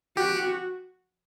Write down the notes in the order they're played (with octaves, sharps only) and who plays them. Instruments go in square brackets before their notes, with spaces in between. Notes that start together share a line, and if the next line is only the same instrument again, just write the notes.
[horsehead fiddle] F#4 [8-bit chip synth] G4